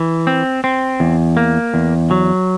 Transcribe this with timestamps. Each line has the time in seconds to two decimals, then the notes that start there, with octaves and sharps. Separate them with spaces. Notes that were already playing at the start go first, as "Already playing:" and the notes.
Already playing: E3
0.27 C4
0.64 C4
1.00 E2
1.37 A#3
1.74 E2
2.11 F#3